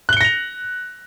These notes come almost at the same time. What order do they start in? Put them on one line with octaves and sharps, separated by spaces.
F#6 G7 C#7 A#6 F7